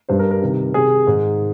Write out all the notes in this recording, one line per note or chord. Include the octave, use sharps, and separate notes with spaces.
G2 G3 C5
A#4
A#4
C3 D#3 G3
C3 G3 G#4
G#2 D#3 G#3